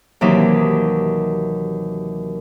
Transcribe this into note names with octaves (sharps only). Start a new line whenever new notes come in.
D#2 C3 E3 F#3 D#4 E5